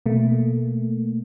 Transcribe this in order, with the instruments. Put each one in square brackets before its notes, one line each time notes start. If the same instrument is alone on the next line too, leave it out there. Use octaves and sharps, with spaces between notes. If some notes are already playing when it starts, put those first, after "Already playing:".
[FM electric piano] B2 A3 A#3